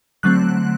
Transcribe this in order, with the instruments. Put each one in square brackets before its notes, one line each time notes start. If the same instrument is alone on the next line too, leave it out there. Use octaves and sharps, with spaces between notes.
[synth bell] D3 F#3 A3 C4 F#6